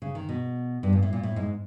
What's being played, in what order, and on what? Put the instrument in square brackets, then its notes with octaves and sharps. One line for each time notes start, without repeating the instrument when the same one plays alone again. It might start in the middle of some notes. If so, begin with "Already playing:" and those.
[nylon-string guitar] C#3
D#3
B2
G2
A#2
A2
A#2
A2
G#2